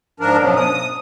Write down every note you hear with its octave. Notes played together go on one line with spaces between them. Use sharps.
G#2 F3 D4 A#4
F#2 B2 F3 F#3
D#6